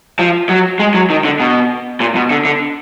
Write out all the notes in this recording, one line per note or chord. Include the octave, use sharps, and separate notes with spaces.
F3
F#3
G#3
F#3
D#3
D3
B2
A#2
B2
D3
D3